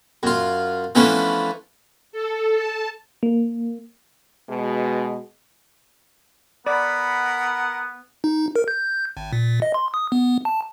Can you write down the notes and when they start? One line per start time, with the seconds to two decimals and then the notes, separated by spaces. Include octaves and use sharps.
0.23 F#2 F4
0.95 E3 F3 A3 B3 C#4 D4
2.12 A4
2.55 A5
3.23 A#3
4.49 B2 G#3
6.67 B3 A#4 D5 F#5 B5
8.24 D#4
8.56 A#4
8.68 G6
9.17 G#1
9.33 A#2
9.62 D#5
9.74 C6
9.94 D#6
10.12 B3
10.45 A5